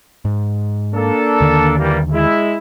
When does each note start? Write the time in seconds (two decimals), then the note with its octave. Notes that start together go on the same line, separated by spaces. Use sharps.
0.25 G#2
0.94 A#3 D4 A4
1.40 D#2 D3 D#3
1.78 E3 G3 A#3
2.13 G#3 E4